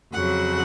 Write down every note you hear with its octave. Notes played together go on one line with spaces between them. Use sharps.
F2 C#3 F#3 F#5